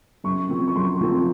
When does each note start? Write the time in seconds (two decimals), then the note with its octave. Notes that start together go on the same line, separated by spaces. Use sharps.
0.24 F#2 C#6
0.49 F3 C4
0.68 C#6
0.76 F#2 C6
1.01 F3 C4